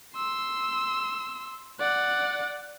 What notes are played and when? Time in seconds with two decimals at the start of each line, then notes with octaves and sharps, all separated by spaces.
0.15 C6 E6
1.80 D5 F#5